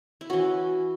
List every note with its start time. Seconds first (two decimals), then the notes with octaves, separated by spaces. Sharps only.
0.21 E4
0.30 E3 C#4 F#4